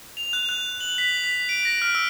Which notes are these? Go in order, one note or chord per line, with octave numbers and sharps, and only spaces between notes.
F7
F#6
F#6
F#7
B6
B6
D7
A#6
F6
E6